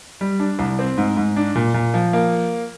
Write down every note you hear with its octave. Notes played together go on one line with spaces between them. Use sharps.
G3
D4
C2
C4
G#2
G#2
D4
A#2
A#2
F3
A#3